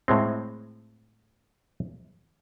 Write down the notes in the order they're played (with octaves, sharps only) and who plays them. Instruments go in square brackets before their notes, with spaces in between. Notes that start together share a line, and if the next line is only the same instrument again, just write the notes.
[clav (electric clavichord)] A2 G#3 C4